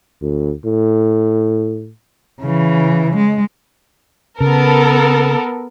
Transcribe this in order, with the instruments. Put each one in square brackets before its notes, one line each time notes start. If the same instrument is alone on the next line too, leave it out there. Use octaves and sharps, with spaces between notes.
[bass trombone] D2
A2
[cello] C#3 E3
G#3
[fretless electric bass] C#3 [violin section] B3 A4 A#4